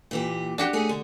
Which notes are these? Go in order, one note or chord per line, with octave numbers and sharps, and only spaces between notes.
A#2 E3 G4
D4 F#4 G4
A3 C#4 G#4
D3